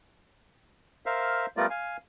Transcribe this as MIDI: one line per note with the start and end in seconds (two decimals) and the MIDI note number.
1.06 1.46 70
1.06 1.46 72
1.06 1.46 76
1.06 1.46 77
1.57 1.67 55
1.57 1.67 57
1.57 1.67 59
1.57 1.67 65
1.57 1.67 70
1.57 1.67 74
1.70 1.97 77
1.70 1.97 80